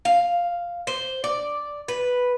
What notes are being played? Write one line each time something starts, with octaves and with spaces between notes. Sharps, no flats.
F5
C5
D5
B4